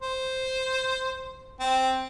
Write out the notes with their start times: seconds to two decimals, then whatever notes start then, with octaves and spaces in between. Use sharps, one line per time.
0.02 C5
1.60 C4